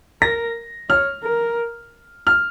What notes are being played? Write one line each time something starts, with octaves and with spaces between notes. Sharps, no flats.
A#4 A#6
C#5 F6
A#4
F6